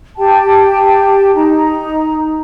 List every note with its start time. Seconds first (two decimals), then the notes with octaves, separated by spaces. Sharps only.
0.18 G4 G5 A5
1.34 D#4 A#5